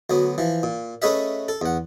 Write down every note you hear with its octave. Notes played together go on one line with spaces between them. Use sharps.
D2 F#3 B3
E3 F3
A#2
A3 C#4 G#4 B4 D#5 E5
A4
E2 F#5